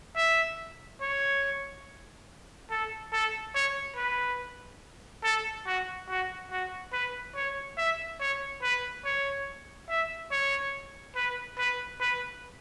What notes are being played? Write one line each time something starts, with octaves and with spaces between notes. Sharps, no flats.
E5
C#5
A4
A4
C#5
B4
A4
F#4
F#4
F#4
B4
C#5
E5
C#5
B4
C#5
E5
C#5
B4
B4
B4